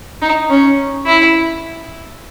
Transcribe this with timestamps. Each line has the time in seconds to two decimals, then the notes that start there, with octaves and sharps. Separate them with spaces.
0.22 D#4
0.50 C#4
1.06 E4